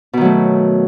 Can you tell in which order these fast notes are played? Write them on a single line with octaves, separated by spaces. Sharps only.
B2 D#3 F#3 A3